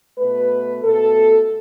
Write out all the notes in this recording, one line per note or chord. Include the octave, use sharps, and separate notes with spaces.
B2 A3 B4
B2 A3 A4